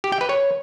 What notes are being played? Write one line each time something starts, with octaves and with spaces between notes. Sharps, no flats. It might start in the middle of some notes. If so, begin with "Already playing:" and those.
G4
G5
B4
C#5